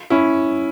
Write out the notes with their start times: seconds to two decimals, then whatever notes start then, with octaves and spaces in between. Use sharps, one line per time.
0.10 C#4 E4